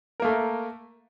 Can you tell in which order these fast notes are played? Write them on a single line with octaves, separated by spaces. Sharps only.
A#4 A#3 A3